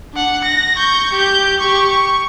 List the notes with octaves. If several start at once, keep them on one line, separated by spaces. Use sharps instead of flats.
D4 F#5
A#6
C#6 G6
G4 G6
G4 C#6
C#6